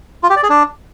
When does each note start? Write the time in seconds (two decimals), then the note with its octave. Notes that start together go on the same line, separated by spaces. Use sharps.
0.23 F4
0.30 G4
0.36 D5
0.43 G#4
0.50 D4